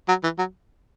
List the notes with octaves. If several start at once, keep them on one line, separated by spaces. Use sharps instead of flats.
F#3
E3
F#3